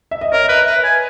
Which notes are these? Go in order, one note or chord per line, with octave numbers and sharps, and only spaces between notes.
E5
D#5
A#4 C#5
D#5
B4
E5
B4
G#5